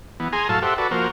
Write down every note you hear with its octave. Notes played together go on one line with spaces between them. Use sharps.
E3 B3
G#4 G#5 A#5 C6
A2 F#3 A4 F5 A5
G4 A4 C5 E5 F#5
F#4 A4 B4 D5
F3 A#3 F#4 A#4 C5